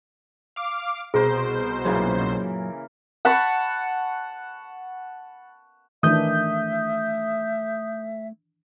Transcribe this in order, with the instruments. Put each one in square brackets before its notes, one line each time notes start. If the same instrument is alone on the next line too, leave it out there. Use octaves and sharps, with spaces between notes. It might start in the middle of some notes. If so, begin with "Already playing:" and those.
[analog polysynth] F5 D6
[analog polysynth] C2 B2 C5 [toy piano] G#4 [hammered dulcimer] A#4
[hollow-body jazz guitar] F#2 A#2 F#3 [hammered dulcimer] C#3 E3 A#3
[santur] F#5 A5 B5 C#6
[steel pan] D#3 E3 D4 [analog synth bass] A3 [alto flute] E5 [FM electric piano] D#6 G6